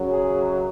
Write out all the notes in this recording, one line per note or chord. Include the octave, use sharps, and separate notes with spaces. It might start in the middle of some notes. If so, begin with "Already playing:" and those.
Already playing: F#2 C#3 F#3
G#4